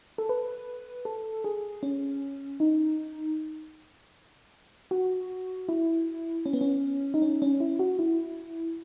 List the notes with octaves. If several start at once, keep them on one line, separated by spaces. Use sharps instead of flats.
A4
B4
A4
G#4
C#4
D#4
F#4
E4
C#4
B3
C#4
D#4
C#4
C#4
E4
F#4
E4